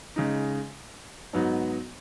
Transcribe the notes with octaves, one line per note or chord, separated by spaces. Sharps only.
C#3 G#3 D#4
G#2 F#3 B3 D#4